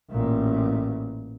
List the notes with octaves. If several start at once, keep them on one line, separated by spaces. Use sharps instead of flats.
A1 A#2